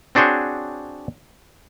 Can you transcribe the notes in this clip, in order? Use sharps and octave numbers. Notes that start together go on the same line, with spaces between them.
C4 D4 F#4 G#4 C5 C#5